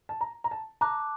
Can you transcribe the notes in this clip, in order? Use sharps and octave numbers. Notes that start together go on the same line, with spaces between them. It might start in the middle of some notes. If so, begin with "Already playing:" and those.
A5
A#5
A#5
A5
A5 A#5 D6 F#6